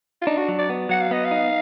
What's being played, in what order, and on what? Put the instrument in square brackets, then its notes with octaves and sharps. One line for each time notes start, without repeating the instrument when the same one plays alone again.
[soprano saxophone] F4
[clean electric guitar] D4 [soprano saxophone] D#4
[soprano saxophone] F#4
[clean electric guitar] F#3
[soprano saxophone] D5
[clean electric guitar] B3
[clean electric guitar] F#3 [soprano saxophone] F#5
[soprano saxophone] F5
[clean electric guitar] B3 [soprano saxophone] D#5
[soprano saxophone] F5
[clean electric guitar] D#4